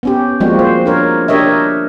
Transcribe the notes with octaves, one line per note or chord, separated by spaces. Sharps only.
B3 C#4 G4
F3 G3 G#3 A#3 C4 F#4
C5
D4 A#4 C#5
D4 G4 A#4 C#5 D#5 E5